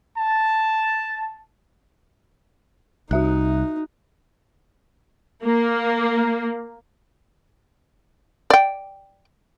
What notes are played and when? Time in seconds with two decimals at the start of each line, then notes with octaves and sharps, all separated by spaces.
0.18 A5
3.11 C2 D#4 F#4 E5 F#6
5.43 A#3
8.50 D5 G5